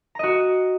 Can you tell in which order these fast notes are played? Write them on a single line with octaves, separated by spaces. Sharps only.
A#5 D#5 F#4